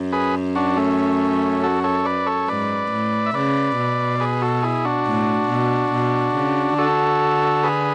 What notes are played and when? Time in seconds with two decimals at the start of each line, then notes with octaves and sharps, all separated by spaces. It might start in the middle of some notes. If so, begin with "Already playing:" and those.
Already playing: F#2
0.12 G#4 B4
0.55 D4 F#4
0.76 A3 C#4
1.63 F#4 A4
1.84 A4 C#5
2.05 B4 D5
2.27 A4 C#5
2.48 G#2 B4 D5
2.91 A2
3.26 E5
3.34 C#3 B4 D5
3.77 B2
4.20 G#4 B4
4.42 F#4 A4
4.63 E4 G#4
4.85 D4 F#4
5.06 A2
5.49 B2
5.92 B2
6.35 C#3
6.78 D3 F#4 A4
7.64 G#4 B4